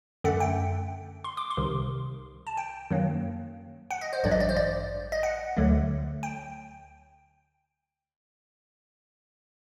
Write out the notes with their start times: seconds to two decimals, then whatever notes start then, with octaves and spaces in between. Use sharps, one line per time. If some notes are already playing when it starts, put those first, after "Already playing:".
0.24 F#2 D3 A3 F#5
0.40 G5
1.24 C6
1.37 D6
1.51 C6
1.57 C2 C3 D#3
2.47 A5
2.57 G5
2.91 F#2 D#3 F#3 A#3
3.91 F#5
4.01 D#5
4.13 C5
4.23 A1 G2 F#3 D5
4.31 D#5
4.40 D5
4.49 C5
4.57 D5
5.12 D#5
5.23 F#5
5.57 D2 D3 F#3 A3
6.23 G5